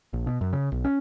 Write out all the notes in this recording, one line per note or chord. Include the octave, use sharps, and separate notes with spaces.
A#1
B2
F#2
C#3
B1
C#4